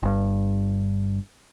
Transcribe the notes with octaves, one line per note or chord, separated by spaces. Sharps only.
G1 G2